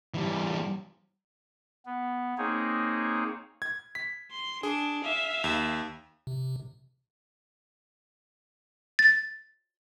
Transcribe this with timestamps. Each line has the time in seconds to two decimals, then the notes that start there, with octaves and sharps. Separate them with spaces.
0.14 E3 G3
1.86 B3
2.38 A#3 C4 D#4 G#4 C#5
3.62 G#6
3.95 B6
4.31 C6
4.63 D4 G#4
5.04 E5 F5
5.44 D#2
6.27 C3
8.99 A6